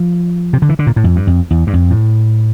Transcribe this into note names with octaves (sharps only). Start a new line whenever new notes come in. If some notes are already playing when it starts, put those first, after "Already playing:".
Already playing: F3
C3
D3
E3
D3
A#2
A2
F2
G2
F2
E2
G2
F2
A2